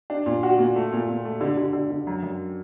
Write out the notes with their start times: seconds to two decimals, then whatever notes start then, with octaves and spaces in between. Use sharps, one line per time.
0.10 D4
0.26 A#2
0.43 F#4
0.59 A#2
0.76 A3
0.93 A#2
1.09 A#2
1.25 A3
1.41 D3
1.57 D3
1.73 D3
1.90 D3
2.07 F#2
2.23 F#2